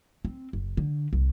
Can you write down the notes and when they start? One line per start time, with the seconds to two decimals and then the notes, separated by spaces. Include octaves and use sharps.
0.25 C4
0.53 F#1
0.77 D3
1.13 C2